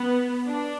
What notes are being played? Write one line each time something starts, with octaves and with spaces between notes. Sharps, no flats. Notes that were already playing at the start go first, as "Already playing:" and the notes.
Already playing: B3
D4